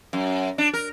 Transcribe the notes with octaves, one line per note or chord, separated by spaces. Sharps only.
F#2
D4
A#4